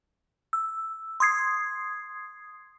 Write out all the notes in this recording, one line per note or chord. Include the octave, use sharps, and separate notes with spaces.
E6
C6 D#6 G#6 C7